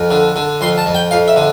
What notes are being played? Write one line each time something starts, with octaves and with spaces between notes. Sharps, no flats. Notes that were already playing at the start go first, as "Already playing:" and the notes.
Already playing: F2
D3
D3
F2 C6
A5
F2
G5
F2 F5
E5
D3